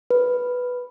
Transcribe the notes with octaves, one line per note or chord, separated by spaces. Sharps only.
B4